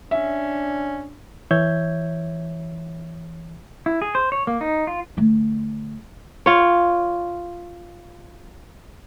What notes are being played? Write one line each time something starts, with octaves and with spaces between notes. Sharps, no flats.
C#4 D4 E5
E3 C#5 E5 G6 G#6
E4
G#4
C5
C#5
A#3
D#4
F4
D3 A3
F4 C#5